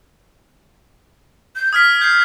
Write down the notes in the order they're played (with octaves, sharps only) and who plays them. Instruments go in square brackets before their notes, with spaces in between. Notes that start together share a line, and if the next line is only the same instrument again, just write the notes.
[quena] G6
[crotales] D#6 F6 B6 [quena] G#6
[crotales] G6 C7